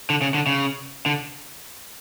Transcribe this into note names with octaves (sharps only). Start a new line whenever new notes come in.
D3
C#3
D3
C#3
D3